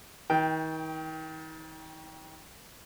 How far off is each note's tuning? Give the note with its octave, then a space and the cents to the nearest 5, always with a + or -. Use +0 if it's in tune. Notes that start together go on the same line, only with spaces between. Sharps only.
D#3 +40 G5 +0